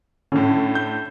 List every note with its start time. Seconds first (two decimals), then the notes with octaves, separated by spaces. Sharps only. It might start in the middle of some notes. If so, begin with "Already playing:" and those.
0.32 A2 D3 C#4
0.75 G6